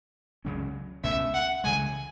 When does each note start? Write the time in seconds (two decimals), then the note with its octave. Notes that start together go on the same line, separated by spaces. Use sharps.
0.45 C#2 C#3 F#3 C#4
1.04 C#2 B2 A3 C#4 E5
1.34 F#5
1.64 C#2 C#3 E3 G#3 G#5